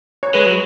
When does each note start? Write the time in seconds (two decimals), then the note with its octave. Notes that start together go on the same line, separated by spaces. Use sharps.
0.23 C#5
0.34 G#3 B4
0.46 F#3